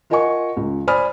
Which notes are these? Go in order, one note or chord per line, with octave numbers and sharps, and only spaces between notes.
F4 A#4 D#5 F#5 G#5 C#6
C#2
C5 D5 G#5 B5 D#6 F6